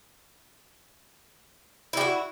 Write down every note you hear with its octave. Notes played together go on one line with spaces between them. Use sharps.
E4 F#4 G4